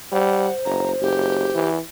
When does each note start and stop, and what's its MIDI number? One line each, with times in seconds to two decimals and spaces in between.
0.12 0.48 55
0.12 1.62 72
0.12 0.53 78
0.65 0.93 30
0.65 0.92 82
1.01 1.49 30
1.01 1.70 67
1.55 1.80 52